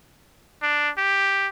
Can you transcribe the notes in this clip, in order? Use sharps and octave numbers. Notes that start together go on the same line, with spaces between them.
D4
G4